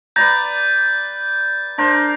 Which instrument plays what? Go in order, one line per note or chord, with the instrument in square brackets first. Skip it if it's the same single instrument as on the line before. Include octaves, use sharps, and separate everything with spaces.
[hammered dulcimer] B4 D5 A#5 [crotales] G6 A6
[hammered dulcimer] D4 A#4 C5